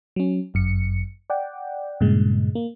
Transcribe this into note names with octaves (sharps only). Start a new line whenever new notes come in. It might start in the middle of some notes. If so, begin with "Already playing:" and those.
F#3 C#4
G1 F#2 C#7
D5 F#5 G5
G2 A#2 C#3 G#3
A#3